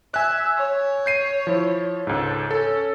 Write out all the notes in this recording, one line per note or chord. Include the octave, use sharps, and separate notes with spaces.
E5 G#5 F#6
C#5
G6 C7 D#7
F3 E4
C#2 G#2 A4
C#4 A4